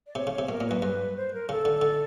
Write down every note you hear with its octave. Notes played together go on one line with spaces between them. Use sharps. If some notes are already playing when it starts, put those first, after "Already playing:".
D5
C3 C#5
C#3
C#5
C3
B2 A#4
A#2
F#2 B4
G2
C5
A#4
C#3 A4
D3
D3